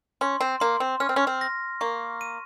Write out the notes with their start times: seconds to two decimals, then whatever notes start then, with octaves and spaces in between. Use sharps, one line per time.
0.21 C#4 C6
0.41 C4
0.60 A#3 C6
0.80 C4
1.00 C#4 F6
1.09 C4
1.16 C#4
1.27 C4
1.41 A#6
1.81 A#3 C#6
2.21 D#7